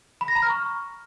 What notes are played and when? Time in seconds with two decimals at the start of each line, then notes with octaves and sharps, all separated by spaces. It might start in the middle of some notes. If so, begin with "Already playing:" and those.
0.21 B5
0.28 A#6
0.35 A#5
0.42 F6
0.50 C#6